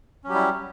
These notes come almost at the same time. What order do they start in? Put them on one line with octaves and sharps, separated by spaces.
C#4 F#3 G4 G3 E4